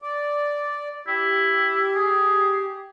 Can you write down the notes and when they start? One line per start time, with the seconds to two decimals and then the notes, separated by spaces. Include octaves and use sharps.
0.02 D5
1.08 E4 G4
1.95 G#4